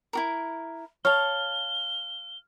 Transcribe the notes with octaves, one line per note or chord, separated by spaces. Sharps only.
E4 F#4 A#4
C#5 F5 A5 F6 G7